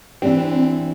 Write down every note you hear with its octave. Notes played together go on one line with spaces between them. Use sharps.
E3 C4 D4 G4